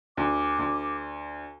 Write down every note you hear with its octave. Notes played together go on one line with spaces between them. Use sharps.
D2 D6
D2